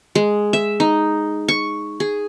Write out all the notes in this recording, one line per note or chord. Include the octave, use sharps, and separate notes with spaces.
G#3
E5
D#4
C#6
G#4